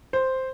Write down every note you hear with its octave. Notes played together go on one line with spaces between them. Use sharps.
C5